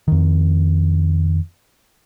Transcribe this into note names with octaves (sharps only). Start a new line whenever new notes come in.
F2 D#3